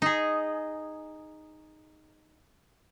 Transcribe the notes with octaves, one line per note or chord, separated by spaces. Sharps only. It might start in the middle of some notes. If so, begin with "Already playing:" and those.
D#4 G#4